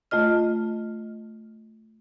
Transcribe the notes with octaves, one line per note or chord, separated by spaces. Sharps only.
A3 F4 D#5 F6